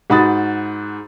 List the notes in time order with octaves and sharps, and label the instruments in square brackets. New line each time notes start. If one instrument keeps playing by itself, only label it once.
[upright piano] G#2 F#4 B5 D#6 A6